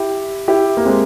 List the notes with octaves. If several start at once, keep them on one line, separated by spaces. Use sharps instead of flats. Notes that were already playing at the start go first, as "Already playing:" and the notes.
Already playing: E4 G4
E4 G4
A#3
G#3 C4